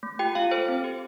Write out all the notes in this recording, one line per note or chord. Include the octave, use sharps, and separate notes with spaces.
A3
F4 G4 G5
A3 F4 F5
A4 C5
C4
G4